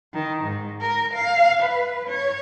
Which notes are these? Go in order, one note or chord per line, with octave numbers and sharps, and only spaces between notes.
D#3
G#2
A#4
F5
B4
C#5